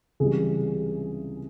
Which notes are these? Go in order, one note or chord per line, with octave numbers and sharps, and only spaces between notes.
C#2 C3 E3 G3 G#4